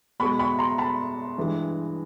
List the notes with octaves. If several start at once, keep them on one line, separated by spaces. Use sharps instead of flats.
B2 G#3 B5 C#6
B5 C#6
A#5 C6
A5 B5
G2 E3 G#3